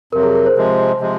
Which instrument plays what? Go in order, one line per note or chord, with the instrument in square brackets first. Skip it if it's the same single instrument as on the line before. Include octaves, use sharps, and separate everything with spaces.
[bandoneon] F2 C3 F#3 [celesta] A#4
[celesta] G#4
A#4
C5
[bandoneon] C3 F3 G#3
C3 F3 G#3